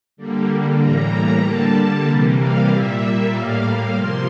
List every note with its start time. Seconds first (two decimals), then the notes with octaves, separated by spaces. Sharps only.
0.17 D3 G3 A#3
0.80 A2 E3 G3 A#3 A#5
1.11 A#5
1.43 D3 G3 A#3 A5
2.07 C3 E3 G3 A#3
2.38 F5
2.69 A#2 G3 A#3 E5
3.01 E5
3.32 A2 G3 A#3 F5
3.63 F5
3.94 C3 F3 A#3 C6